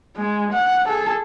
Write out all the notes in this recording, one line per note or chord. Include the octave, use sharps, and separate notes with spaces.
G#3
F#5
G#4 A4